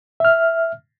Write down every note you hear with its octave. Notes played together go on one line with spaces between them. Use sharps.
E5 F6